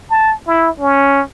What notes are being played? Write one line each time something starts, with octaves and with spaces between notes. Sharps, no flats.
A5
E4
C#4